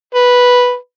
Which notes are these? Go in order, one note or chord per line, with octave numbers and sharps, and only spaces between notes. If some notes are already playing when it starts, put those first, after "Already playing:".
B4